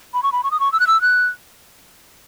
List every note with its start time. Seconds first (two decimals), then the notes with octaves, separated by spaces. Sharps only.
0.14 B5
0.23 C#6
0.32 B5
0.44 C#6
0.51 D#6
0.60 C#6
0.73 E6
0.80 F#6
0.87 E6
1.02 F#6